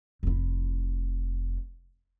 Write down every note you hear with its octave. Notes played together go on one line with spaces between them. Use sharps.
F1 E4